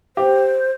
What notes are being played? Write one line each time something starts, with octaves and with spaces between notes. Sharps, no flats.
G4 C5